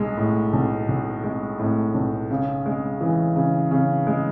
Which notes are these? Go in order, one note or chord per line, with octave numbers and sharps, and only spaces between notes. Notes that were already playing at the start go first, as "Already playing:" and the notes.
Already playing: B1 G#3
A2
B1
B1
G#3
A2
B1
C#3
G#3
E3
C#3
C#3
G#3